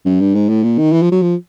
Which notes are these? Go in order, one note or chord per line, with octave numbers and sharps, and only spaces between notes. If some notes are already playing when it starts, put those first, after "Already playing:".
F#2
G2
G#2
A2
A#2
D#3
E3
F3
F#3
F3